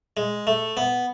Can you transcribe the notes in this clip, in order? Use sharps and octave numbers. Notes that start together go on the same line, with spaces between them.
G#3
A3
B3